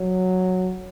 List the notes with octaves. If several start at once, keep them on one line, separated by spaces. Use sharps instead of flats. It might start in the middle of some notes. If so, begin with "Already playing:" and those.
Already playing: F#3